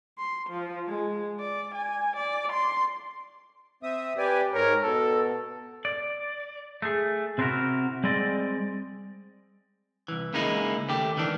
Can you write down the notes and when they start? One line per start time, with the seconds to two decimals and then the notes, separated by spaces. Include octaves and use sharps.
0.18 C6
0.50 F3
0.88 G#3
1.40 D5
1.75 G#5
2.17 D5
2.52 C6
3.83 C4 E5 D#6
4.18 G4 B4 D5 G#5
4.53 G#2 A#4 C#5
4.82 B2 A4
5.85 D5
6.82 A3 G#4
7.38 C3 C4 D4 E4 F#4 A#4
8.04 G3 G#3 C4 D5 D#5
10.08 C2 E3
10.33 C#2 C#3 G#3 A#3 D#4 E4
10.89 D#2 A3 G4
11.17 C#2 D#3 E3 D4